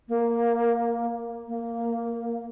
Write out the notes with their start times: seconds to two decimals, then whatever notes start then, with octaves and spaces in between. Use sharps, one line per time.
0.09 A#3
1.48 A#3